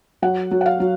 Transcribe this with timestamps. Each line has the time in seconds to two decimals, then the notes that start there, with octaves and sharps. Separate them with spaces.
0.22 F#3 F#5
0.51 F#3
0.61 F#5
0.66 F5
0.80 F#3